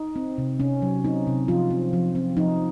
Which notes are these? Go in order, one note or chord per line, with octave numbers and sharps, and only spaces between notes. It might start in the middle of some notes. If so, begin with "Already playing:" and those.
Already playing: D#4
C4
C3
C3 C#4
F#3
C4 D#4
C3
F3 F4
C4
F3
C4
F3 D#4